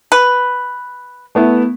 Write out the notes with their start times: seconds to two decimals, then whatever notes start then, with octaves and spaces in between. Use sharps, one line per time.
0.12 B4
1.35 A3 B3 E4